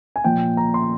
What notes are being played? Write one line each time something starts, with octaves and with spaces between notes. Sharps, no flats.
G#5
A#2 F3 G5
A#5
C6